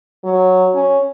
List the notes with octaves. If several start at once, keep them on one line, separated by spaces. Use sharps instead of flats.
F#3
C#4